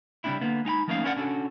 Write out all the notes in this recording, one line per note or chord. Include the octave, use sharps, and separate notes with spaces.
C#3 G3 A#3 C4 D4 E4
D3 A#3 B3
G#3 D#4 G5 B5
F3 A3 A#3 C#4 D#4 F5
C#4 D4 E4 A#4 D5 F#5
C#4 D4 F#4 A4